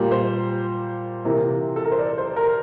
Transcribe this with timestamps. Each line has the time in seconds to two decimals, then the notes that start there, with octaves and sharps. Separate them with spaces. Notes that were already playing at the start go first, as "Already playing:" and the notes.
Already playing: A#2 G3 A#3
0.11 C5
1.24 C3 E3 A#3
1.76 A4
1.85 A#4
1.91 C5
1.98 D5
2.18 C5
2.36 A#4